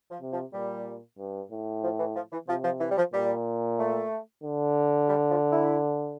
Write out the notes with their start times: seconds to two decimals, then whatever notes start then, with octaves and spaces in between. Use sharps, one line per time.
0.10 F3
0.21 C3
0.32 F3
0.53 A#2 G3
1.18 G2
1.51 A2
1.84 F3
1.99 E3
2.16 F3
2.32 E3
2.48 C3 F3
2.64 F3
2.80 E3
2.91 G3
2.98 F3
3.13 A#2 G3
3.79 A3
4.43 D3
5.08 G3
5.30 F3
5.52 E4